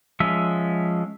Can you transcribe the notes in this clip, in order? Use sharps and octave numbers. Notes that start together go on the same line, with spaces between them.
F3 G#3 C#4 E5